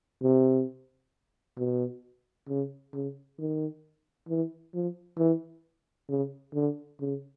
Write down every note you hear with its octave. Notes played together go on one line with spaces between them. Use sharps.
C3
B2
C#3
C#3
D#3
E3
F3
E3
C#3
D3
C#3